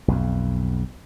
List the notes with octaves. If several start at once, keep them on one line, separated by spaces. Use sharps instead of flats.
B1 F2